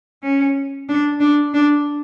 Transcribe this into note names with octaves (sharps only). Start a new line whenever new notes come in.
C#4
D4
D4
D4